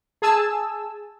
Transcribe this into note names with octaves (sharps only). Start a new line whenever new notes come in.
G#4 G#5 A5 E6